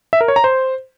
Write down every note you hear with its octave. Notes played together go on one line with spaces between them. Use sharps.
E5
A#4
C#5
A#5
C5